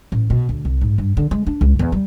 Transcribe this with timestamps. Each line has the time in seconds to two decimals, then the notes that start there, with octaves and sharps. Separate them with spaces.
0.12 A1
0.30 B2
0.49 D2
0.65 C2
0.81 G#2
0.98 G2
1.17 D3
1.31 G#3
1.47 D4
1.61 C#2
1.79 E2
1.92 G3